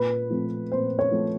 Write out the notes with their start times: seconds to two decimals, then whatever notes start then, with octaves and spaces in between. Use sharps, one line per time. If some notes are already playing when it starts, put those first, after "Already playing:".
Already playing: A#2 B4
0.30 F3 A3 C4
0.71 A#2 C5
0.99 C#5
1.11 F3 A3 C4